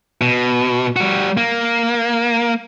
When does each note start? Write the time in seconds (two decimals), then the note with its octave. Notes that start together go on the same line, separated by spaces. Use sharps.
0.21 B2
0.96 G3 F#4
1.37 A#3